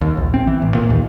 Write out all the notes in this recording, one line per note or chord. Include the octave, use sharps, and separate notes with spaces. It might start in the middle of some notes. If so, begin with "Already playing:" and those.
D#2
A#1
C4
E3
A1
A#2
D#2